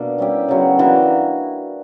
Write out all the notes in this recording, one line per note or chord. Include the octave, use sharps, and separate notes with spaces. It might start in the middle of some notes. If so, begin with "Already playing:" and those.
Already playing: B2 A#3 D4
G3 C#4 E4 G4
C#3 F#3 B3
E3 A#3 D4 F#4